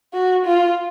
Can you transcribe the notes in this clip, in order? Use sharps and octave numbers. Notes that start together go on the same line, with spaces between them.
F#4
F4